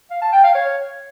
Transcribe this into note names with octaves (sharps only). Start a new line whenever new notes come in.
F5
A5
G5
F5
C#5